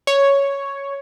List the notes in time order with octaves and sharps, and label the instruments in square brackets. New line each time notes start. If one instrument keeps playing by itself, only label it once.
[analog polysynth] C#5